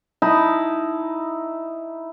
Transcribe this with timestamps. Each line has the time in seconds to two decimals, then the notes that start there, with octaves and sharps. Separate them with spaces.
0.22 D#4 E4 A5 B5